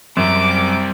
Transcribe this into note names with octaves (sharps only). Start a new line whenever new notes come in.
F#2 G3 C4 D6